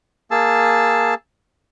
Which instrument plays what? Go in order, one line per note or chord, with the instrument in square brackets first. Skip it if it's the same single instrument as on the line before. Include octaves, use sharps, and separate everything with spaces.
[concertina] A#3 G#4 A5 E6